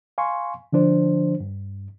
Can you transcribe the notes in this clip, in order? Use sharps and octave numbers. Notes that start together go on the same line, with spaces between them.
F5 G#5 C6 C#6
D3 F3 D4 C5
G2